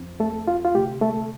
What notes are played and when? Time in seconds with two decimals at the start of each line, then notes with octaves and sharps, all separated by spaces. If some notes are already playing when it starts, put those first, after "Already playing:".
Already playing: F2 F3 C4
0.20 A3 A4
0.47 F4
0.65 F4
0.74 D2 C3 A3 G4
1.01 A3 A4